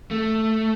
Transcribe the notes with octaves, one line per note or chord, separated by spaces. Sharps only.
A3